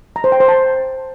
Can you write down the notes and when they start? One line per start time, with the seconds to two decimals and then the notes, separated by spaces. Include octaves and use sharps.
0.16 A#5
0.24 C5
0.32 G5
0.40 C5
0.48 A5